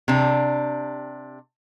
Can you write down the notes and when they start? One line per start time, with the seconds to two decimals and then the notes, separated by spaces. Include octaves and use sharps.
0.08 C3 D4